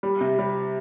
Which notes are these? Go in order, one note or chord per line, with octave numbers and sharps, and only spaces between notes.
G3
C3
G3